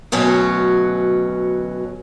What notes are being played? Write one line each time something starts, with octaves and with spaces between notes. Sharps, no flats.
D2 B2 F#3 C#4